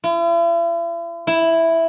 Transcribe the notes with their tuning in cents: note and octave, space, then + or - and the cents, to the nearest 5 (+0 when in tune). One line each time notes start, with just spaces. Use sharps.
E4 +45
E4 +0